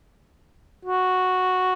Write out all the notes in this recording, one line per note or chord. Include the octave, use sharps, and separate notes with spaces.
F#4